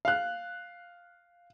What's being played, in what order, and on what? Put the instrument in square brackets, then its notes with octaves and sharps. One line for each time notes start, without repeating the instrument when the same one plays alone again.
[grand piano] F5 F#6